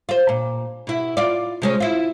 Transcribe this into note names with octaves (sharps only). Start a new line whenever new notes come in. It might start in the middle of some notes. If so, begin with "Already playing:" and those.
F4 C5
A#2
B2 E4
F4 D5
C3 G#3 C#4
E4 F4